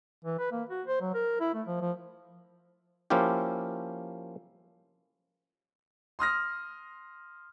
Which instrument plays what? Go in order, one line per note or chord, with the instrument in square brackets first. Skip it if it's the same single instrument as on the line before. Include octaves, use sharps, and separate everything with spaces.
[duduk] E3
B4
A#3
F#4
C5
F#3
A#4
E4
A3
F3
F3
[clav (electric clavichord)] F3 A#3 C#4 E4 F4 G4
[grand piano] C6 D#6 F6 A#6